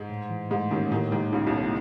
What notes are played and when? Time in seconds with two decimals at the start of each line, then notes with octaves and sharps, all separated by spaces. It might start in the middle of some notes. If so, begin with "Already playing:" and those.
Already playing: G#2 G#3
0.09 A2
0.30 E3
0.50 G#2 G#3 A3
0.71 D#2 D#3 C#4
0.91 D#2 A2 D#3
1.12 D#2 D#3 G#3
1.32 C#2 C#3 D#4
1.47 B1 B2
1.53 F#4
1.60 A2